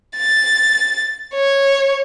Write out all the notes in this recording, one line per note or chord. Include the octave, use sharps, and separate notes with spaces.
A6
C#5